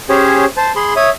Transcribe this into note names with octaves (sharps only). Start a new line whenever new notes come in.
C#4 G4 G#4 C5 C#5
C5 A5
G#4 B5 C6
C#5 E5 D#6